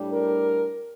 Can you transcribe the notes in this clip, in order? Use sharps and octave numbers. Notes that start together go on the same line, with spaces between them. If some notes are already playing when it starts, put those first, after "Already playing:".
Already playing: A2 G3 D4
A#4